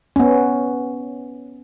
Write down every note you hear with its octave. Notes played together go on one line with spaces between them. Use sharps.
B3 C#4